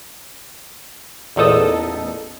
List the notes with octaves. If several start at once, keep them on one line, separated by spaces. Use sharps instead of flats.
A1 E2 A#2 D#4 A4 D#6